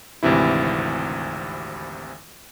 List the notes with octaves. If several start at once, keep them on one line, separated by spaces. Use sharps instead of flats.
G#1 D2 C3 E3 E4